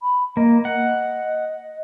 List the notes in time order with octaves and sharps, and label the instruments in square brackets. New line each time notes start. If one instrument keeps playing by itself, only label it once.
[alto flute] B5
[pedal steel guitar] A#3 [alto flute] D#5
[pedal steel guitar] F#5